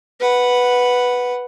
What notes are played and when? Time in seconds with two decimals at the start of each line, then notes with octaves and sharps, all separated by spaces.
0.20 B4 F#5